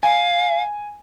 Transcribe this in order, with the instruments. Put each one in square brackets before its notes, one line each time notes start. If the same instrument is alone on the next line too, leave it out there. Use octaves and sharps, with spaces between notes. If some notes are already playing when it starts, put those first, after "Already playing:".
[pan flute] F5 [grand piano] G#5